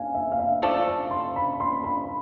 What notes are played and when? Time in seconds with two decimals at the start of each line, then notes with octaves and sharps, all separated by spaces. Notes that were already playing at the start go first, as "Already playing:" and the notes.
Already playing: F5 G#5
0.14 E5
0.32 F5
0.39 E5
0.62 F3 A3 D4 A4 F5
0.88 A5
1.11 C6
1.36 B5
1.60 C6
1.84 B5